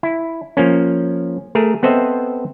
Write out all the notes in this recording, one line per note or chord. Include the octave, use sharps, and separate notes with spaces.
E4
F3 A#3 C#4
A3 G#4 A#4
B3 C4 A4 C5 D#5 E5